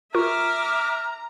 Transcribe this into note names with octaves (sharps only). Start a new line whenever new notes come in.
F4 A#4 E5 A#5 C#6 D6 F6